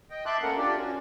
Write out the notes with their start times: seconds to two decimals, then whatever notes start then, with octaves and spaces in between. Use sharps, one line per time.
0.10 D#5 G5
0.26 E5 A5 C6 D6 F#6
0.43 A3 A#3 C#4 A4 A#4 F#5
0.57 D4 F4 G4 D5
0.77 C#4 F#4